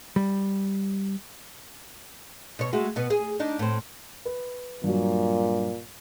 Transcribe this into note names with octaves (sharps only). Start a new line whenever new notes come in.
G3
B2 C#5
G#3 A3 F#4
B2 B3
G#4
D4 D#4
A2 C4
B4
G2 A#2 F#3